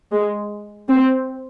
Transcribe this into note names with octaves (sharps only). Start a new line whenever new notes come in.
G#3
C4